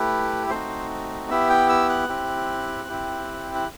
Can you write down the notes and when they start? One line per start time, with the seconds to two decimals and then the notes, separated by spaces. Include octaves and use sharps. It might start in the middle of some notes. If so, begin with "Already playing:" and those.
Already playing: A3 E4 G4 B4
0.50 A3 C4 D#4 F#4 C5
1.30 B3 E4 G4 E5
1.49 G5
1.69 E6
1.89 F#6
2.09 C4 E4 G4
2.89 C4 E4 G4
3.55 F#6